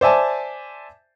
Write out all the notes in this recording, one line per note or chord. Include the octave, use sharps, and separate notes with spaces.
C5 D5 E5 G#5 A5